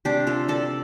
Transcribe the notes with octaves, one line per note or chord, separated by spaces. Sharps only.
C3 A3 D4 G4
F4 A4
A4 D5